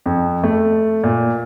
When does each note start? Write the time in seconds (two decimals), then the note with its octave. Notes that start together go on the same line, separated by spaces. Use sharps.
0.06 F2
0.44 A3
1.04 A#2